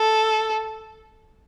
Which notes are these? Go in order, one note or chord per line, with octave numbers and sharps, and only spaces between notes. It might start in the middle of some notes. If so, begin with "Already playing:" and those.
Already playing: A4